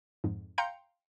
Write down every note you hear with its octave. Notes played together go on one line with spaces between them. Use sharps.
F2 G#2
F5 G5 A#5 C6 G6 C#7